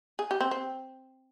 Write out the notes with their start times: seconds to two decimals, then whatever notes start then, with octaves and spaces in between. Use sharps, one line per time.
0.19 G#4
0.31 G4
0.41 C4
0.51 C4